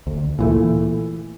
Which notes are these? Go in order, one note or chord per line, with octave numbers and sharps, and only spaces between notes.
D2
A#2 E3 A3